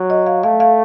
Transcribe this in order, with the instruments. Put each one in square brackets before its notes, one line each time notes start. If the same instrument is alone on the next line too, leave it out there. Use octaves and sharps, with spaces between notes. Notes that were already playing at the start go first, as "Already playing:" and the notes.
Already playing: [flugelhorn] F#3
[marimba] D#5
F5
[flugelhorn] A3 [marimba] F5
[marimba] F5